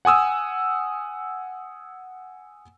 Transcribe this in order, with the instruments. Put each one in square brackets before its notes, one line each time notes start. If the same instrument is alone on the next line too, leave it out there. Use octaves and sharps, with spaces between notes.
[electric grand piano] F#5 G#5 D#6 E6